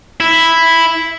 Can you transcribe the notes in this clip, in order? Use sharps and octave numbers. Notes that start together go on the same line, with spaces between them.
E4